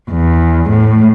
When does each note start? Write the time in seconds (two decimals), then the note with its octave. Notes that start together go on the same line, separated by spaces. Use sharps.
0.11 E2
0.71 A2